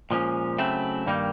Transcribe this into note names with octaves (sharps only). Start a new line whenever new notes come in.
A#2 F3 G#3 C#4
C#3 F#3 A3 C4 E4
G2 D#3 G3 A#3 D#4